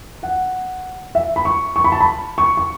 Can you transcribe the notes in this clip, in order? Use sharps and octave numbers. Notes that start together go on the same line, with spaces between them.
F#5
E5
B5
C#6
C#6
B5
A5
B5
C#6
C#6